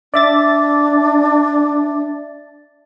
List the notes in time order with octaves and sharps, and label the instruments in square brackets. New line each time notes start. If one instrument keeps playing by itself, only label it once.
[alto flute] D4 [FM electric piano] D5 E5 A6